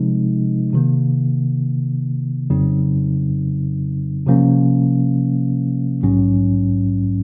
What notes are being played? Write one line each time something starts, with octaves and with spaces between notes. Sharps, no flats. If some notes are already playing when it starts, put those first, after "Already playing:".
Already playing: C3 F3 G#3 C4 D#4
C3 D#3 A#3
F2 C#3 F#3 C4 D#4
C3 F3 A#3 C#4
A#1 G#2 F#3 C#4